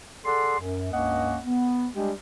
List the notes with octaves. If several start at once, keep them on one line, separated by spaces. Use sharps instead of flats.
G#4 A4 D5 F#5 C6
F#2
C#2 G2 A#3 C#4 D#5 F#5
B3
G3 G#3 D4 G4